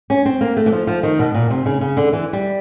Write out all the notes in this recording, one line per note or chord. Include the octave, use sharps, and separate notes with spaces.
C#4
C4
A#3
A3
E3
F3
F3
D#3
B2
A#2
C3
C#3
C#3
D3
E3
G3